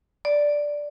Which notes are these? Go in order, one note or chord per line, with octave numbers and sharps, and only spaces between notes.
D5